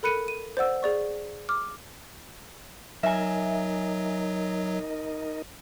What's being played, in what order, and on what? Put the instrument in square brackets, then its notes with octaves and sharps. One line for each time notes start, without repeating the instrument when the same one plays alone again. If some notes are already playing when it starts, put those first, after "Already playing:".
[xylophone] A4 A#4 B5 F#6 C#7 D#7
D#7
C5 D5 F#5 E6
G#4 D5 C#6
D6 F6
[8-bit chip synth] F#3 [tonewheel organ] D#4 A#4 D#5 [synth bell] E5 G#5